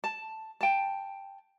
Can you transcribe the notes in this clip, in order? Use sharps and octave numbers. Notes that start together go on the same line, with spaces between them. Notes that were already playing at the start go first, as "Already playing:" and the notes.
A5
G5 A5